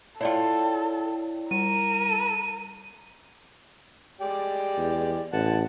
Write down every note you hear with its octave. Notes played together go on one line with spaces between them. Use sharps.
E4 F4 A4 C#5 D5 G5
G3 A#4 D#7
G#3 G4 D5
E2
A1 F#5 A5